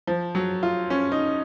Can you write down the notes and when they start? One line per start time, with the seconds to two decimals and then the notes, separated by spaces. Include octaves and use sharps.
0.07 F3
0.35 F#3
0.63 F4
0.90 C#4
1.12 D#4